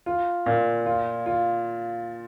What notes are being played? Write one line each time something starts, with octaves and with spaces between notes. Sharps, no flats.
F4
A#2
F4
F4